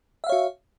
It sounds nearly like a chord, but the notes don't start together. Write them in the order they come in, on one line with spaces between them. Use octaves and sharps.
E5 F5 C#5 F#4